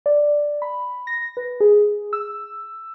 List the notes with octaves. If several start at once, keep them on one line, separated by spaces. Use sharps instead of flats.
D5
B5
A#6
B4
G#4
E6